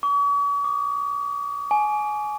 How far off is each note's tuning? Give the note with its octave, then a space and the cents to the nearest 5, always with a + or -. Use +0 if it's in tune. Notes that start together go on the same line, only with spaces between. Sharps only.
C#6 +45
D6 +35
G#5 +25